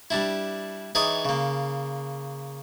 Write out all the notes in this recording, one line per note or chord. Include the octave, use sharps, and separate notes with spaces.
G3 D4 E4
E3 D#4 G#4 C#5 D5
C#3 A#3